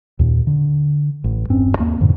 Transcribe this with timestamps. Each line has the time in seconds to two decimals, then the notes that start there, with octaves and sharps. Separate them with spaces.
0.19 D#2 A#2
0.47 D3
1.24 A1
1.49 E1 G2 C4 C#4
1.79 D#2 A#3 C4
2.00 F2 G#2 B2 D3